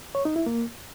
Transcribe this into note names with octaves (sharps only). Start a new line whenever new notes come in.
C#5
D#4
E4
A#3